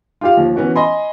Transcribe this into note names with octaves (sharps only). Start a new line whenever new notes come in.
F4 G4 F5
D#2 F3
E3 B3 C#4 F#4
D#5 G#5 B5 C6